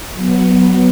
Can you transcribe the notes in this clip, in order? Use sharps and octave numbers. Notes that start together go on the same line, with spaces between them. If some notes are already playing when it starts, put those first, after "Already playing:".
F#3 B3